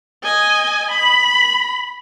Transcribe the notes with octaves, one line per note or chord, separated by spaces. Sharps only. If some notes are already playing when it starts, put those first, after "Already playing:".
D#5 G#5
B5